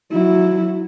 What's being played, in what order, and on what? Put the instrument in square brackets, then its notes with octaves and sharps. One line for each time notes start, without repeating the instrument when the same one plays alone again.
[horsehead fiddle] F#3 E4